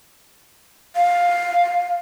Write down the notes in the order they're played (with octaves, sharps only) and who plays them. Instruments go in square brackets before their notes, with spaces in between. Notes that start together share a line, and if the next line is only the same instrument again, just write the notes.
[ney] F5